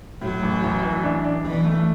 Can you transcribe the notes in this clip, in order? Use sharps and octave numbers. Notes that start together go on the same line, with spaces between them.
A2 F#3
A1
A1
E3
D4
D4
B1 E3
A3